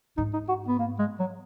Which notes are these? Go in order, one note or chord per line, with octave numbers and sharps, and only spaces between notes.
G#2 D#4
D#4
F#4
B3
A#3
G#3
F#3